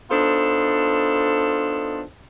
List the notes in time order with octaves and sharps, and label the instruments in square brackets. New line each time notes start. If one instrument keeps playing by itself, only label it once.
[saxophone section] B3 D4 D#4 F4 A4 C5